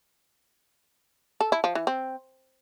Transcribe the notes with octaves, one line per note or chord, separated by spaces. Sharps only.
A4
E4
F3
E3
C4